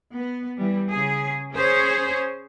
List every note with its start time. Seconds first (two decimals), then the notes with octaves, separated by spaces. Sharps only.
0.14 B3
0.57 E3 G3
0.90 C#3 G#4
1.53 C#4 G#4 C5 C#5